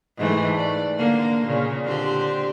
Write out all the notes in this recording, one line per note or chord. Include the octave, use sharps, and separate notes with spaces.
G#2 E3 A3
D5
D3 A#3
A#2 C#3
D3 C4 G4